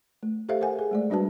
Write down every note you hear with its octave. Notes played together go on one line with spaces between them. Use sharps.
A3
G4 A4 C5 E5 F5
A#4 C5 F#5 G#5
G#4
G#3 A3 D5
G3 D4 F#4 B4 A5